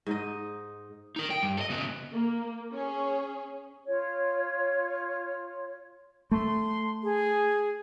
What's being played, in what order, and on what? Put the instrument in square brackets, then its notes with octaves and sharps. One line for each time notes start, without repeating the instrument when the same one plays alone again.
[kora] G#2 D#4 D#5
[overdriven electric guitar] D#4 A#4
G5
G2
A4 D#5
C#3 B3
[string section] A#3
C#4 G#4 C#5
[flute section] F4 C#5
[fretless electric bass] A3 [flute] C6
[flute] G#4